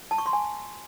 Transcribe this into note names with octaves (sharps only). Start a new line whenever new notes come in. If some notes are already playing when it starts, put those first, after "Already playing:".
A5
C#6
C6
G#5